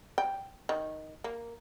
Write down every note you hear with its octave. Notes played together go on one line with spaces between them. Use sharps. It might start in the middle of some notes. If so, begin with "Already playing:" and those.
G5
D#3
A#3